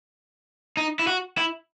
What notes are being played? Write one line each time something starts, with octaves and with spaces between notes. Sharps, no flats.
D#4
E4
F#4
E4